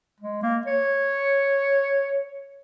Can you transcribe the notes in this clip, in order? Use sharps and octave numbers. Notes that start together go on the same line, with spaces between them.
G#3
A#3
C#5